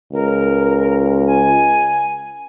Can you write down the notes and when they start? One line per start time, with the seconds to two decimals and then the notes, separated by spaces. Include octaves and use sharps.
0.13 C#2 A#4
1.26 G#5